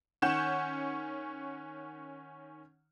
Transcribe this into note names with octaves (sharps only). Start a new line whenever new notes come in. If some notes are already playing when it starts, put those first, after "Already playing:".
D#3 C#4 F#5 C#6 G6 E7